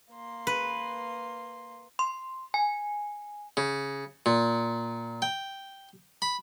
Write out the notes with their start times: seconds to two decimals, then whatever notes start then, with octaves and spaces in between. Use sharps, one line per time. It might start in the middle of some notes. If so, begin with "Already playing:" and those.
0.12 A#3 C6
0.47 B4
1.99 C6
2.54 G#5
3.57 C#3
4.26 A#2
5.22 G5
6.22 B5